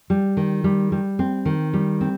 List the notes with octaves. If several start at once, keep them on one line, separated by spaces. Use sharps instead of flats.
G3
D#3
G3
G3
C4
D#3
G3
C4